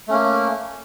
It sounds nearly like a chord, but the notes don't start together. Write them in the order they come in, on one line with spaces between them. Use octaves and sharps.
A3 C#4 A#3